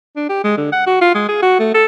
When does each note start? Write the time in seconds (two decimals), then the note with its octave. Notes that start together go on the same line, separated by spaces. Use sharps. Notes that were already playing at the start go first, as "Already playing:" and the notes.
0.16 D4
0.29 G4
0.44 G#3
0.57 D3
0.72 F#5
0.86 F#4
1.01 F4
1.15 G#3
1.29 G#4
1.42 F#4
1.59 A3
1.74 A4